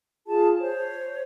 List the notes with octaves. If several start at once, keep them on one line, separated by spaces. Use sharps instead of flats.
F4 G#4 A5
C5 C#5